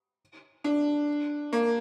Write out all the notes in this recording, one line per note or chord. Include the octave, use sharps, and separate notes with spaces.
D4
A#3